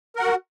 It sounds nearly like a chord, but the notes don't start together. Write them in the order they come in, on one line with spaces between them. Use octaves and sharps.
A#4 F#5 F#4